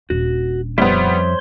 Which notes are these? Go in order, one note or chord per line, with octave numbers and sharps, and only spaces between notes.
D#1 D4 F#4
F2 G3 B3 C5 C#5 E5 C6